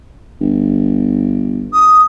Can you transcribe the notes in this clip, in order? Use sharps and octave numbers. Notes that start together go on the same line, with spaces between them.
G1
D#6